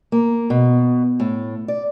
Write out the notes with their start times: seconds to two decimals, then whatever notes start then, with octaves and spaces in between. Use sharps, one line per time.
0.12 A#3
0.50 B2
1.20 A2
1.68 D5